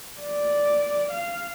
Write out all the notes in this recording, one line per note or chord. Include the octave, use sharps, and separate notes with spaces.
D5
F5